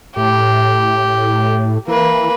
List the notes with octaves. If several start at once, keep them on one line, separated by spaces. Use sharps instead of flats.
A2 G4
E3 A#3 B4